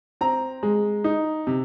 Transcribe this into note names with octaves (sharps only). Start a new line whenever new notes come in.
C4 A#5
G#3
D#4
C3